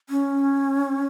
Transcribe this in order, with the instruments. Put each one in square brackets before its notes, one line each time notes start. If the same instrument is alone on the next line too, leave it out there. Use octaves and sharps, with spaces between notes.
[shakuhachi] C#4